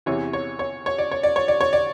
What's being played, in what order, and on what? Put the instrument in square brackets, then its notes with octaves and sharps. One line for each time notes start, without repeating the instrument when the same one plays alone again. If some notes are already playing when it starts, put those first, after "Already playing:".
[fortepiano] E2 C3 E3 C#5
C#5
C#5
C#5
D5
C#5
D5
C#5
D5
C#5
D5